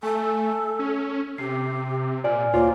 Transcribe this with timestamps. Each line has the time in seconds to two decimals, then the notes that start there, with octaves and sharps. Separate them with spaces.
0.03 A3 A4 G#5
0.79 C#4
1.38 C3 G4 C7
2.24 A#2 C5 D5 G#5 F6
2.54 D2 A#3 F4 C5 C#5 D6